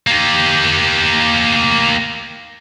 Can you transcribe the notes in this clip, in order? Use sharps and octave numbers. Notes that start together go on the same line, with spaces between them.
A#3 G4